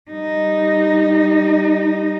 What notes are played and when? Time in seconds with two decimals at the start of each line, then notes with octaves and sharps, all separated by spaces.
0.11 G3 D#4